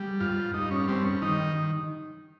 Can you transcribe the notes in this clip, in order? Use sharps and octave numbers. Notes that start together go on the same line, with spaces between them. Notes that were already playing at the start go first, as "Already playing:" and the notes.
Already playing: G3
G2 F4
G2 D#4
C#4
G3 C4
C#4
D#3 D#4